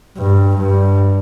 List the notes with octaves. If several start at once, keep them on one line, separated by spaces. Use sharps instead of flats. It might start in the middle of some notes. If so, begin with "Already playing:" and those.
G2
G2